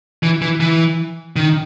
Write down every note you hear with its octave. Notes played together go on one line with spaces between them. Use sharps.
E3
E3
E3
D#3